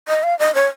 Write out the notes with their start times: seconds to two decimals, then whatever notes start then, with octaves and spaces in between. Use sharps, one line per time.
0.08 D#5
0.23 F5
0.39 D#5
0.55 C#5